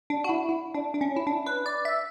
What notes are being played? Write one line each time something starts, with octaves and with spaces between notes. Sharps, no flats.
D4
F#4
E4
E4
D4
D4
C#4
E4
D4
B4
D5
E5